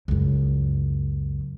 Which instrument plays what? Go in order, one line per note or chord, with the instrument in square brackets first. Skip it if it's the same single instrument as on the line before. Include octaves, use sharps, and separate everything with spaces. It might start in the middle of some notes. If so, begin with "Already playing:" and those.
[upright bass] C#2 F#2